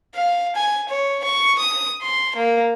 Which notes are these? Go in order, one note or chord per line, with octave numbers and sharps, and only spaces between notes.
F5
G#5
C#5
C#6
D#6
C6
A#3